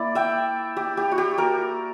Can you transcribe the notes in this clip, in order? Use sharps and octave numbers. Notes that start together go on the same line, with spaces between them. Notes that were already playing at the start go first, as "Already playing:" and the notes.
Already playing: A#3 E4 D5
E5 G5
G4
G4
F#4
G4
F#4 A#4